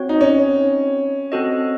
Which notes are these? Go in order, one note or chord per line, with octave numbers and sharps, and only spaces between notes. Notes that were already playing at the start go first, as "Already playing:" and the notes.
Already playing: C4 F#4 C#5
D#4
C#4
C4 F#4 A4 D#5